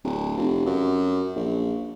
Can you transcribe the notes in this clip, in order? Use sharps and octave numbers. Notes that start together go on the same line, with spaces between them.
D1
F1
F#2
A#1